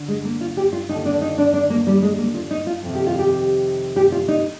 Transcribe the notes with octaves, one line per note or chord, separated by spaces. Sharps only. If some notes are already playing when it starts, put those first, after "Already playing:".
Already playing: D3
G#3
A#3
F4
G4
F4
D#2 D3 D#4
D4
D#4
D4
D4
A#3
G3
G#3
A#3
F4
D#4
F4
F2 C3 D#3
G4
F4
G4
G4
F4
D#4